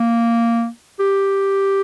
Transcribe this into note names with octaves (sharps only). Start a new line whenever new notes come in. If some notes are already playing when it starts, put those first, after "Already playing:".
Already playing: A#3
G4